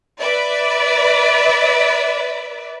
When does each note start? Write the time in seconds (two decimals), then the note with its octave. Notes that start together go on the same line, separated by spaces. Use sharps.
0.19 B4 D5 E5